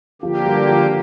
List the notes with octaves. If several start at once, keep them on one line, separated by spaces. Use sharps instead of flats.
D3 F3 A#3 G4
G3
F3